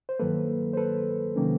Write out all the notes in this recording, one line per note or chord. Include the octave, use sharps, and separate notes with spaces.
C5
G2 D#3 F#3 A#3 A4 B4
C5
A4 B4
C3 D#3 F#3 A#3 C#4